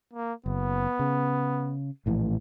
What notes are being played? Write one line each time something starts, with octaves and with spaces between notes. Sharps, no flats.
A#3
F#1 B3
C#3
A#1 A2 E3